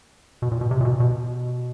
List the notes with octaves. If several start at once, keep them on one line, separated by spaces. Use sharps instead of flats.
B2
A#2
B2
C3
A#2
B2
B2